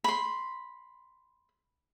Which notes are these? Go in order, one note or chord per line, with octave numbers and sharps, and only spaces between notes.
B5 C6